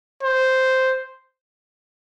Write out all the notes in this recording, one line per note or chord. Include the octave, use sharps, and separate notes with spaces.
C5